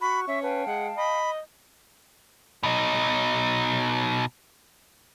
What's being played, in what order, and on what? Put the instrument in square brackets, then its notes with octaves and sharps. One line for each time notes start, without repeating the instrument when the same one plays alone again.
[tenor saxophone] F#4 [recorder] B5 [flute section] C#6
[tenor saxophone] C#4 [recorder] E5
[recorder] B4 [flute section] F5 G5 A5
[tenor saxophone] G#3 [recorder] F#5
[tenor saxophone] D#5 [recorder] B5
[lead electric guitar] B2 D#4